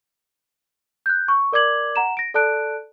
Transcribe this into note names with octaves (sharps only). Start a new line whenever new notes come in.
F#6 G6
C#6
A#4 D5 D6 G#6 F#7
F#5 A#5 E7
A#6 D7
A4 D5 A5 F#6 D7